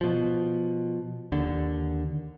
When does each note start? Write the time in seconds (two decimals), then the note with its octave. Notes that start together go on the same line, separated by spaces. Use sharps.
0.01 B2 F3
1.32 D#2 D3